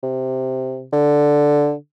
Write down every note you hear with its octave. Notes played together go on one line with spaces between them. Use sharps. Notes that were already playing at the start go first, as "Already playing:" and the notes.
C3
D3